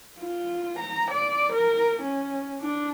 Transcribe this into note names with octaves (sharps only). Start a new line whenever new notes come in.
F4
A#5
D5
A#4
C#4
D4